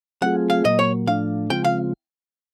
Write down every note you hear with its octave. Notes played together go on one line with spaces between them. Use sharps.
F#3 A3 C4 F4 G#4 F#5
F5
A#2 F#3 A#3 D#5
C#5
A2 F3 A3 D4 F5
C#3 F3 G#3 C4 F4 G5
F5